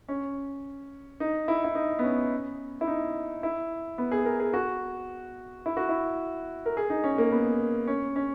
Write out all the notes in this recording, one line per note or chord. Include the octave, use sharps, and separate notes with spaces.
C#4
D#4
E4
E4
D#4
B3
C#4
E4
D#4
E4
B3
G#4
A#4
G#4
F#4
E4
F#4
E4
A#4
G#4
D#4
C#4
A#3
B3
C#4
C#4